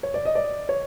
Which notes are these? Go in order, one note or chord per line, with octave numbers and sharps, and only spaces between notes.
C#5
D5
D#5
D5
C#5